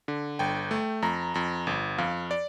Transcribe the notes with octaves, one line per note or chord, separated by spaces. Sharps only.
D3
G1 G5
A3
F2 A#5
F2 A#5
G1
F2 F5
D5